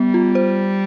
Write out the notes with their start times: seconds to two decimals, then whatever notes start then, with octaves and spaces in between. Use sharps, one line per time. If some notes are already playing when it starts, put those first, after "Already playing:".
Already playing: G3 B3
0.14 F4
0.35 C5